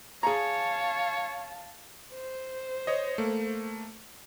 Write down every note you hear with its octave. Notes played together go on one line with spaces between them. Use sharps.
G#4 C#5 F5 A5 A#5
C5
C#5 D#5
A3 A#3